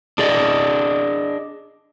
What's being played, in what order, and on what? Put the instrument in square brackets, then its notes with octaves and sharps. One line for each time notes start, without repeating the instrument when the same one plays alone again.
[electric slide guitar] D4 G#4 D5 D#5